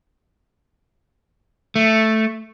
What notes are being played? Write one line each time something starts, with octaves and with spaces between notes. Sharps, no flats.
A3